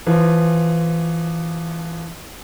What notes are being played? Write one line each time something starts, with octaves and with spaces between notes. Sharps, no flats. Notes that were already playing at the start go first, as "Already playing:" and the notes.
E3 F3